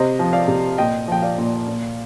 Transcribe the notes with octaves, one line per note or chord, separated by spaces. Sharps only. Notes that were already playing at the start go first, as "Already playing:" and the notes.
Already playing: C3 C5 D#5
F3
D5 F5
C3
A#2 D#5 G5
F3 G5
D5 F5
A#2
A#2